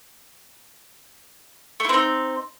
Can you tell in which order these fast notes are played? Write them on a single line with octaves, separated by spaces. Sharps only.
A3 E4 C4 D#4